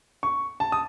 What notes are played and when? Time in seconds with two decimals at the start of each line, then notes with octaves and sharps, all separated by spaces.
0.23 C#6
0.60 A5
0.72 D#6